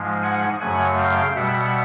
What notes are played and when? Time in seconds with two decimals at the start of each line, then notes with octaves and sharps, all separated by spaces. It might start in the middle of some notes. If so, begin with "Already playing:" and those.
Already playing: G#2 F3 G#3
0.23 F#5 G#5
0.61 F#2 C#3 F#3 A3 F#5 G#5
0.98 F5 G5
1.36 B2 G3 E5 F#5